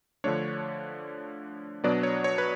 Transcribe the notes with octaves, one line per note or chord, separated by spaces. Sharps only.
D3 F3 A3 D4 C#5
B2 F#3 B3 D4 D5
C#5
C#5
B4